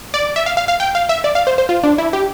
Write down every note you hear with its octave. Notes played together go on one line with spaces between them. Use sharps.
D5
E5
F5
F5
F5
G5
F5
E5
D5
F5
C5
C5
F4
D4
E4
G4